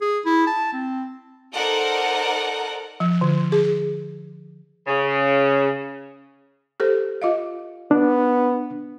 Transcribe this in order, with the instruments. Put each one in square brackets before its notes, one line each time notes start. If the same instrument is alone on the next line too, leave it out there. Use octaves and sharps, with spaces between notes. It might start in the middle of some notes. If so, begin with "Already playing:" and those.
[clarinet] G#4
E4
A5
C4
[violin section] D#4 A4 A#4 C5 D5 F#5
[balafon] F3
D3
G#4
[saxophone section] C#3
[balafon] G4 A4 C5
F4 D#5 F5
[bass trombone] B3 [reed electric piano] D4